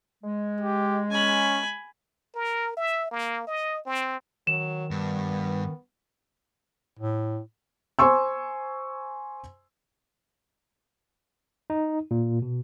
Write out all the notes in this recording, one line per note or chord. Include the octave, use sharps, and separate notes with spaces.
G#3
G4
C#4 G#5 B5
A#4
E5
A#3
D#5
C4
D#3 F#3 E7
G2 B3
A2
C5 G#5 C6 C#6 E6
D#4
A#2
B2